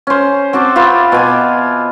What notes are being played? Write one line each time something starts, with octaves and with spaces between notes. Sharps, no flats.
C#4 C5
C4 F#4 A5 D6
F4 G4 B4 E5
B2 G#5 D6